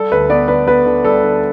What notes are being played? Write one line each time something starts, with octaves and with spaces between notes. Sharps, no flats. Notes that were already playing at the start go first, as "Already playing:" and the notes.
Already playing: G3 A4
D2 B4
B3 D5
D3 B4
B3 B4
D3
G3 A4
D3